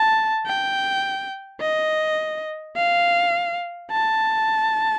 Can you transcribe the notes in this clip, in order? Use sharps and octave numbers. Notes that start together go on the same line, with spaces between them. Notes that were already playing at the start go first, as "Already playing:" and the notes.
Already playing: A5
G5
D#5
F5
A5